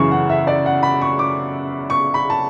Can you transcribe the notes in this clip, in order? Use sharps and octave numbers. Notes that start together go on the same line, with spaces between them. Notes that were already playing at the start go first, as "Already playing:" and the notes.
Already playing: F#2 C#3 E3 C#6
F#5
E5
D5
F#5
B5
C#6
D6
C#6
B5
A5